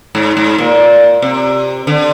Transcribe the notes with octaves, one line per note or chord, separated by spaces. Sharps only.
G#2
G#2
A#2
C3
D3